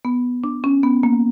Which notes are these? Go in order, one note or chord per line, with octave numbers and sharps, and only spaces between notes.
B3
D4
C#4
B3
A#3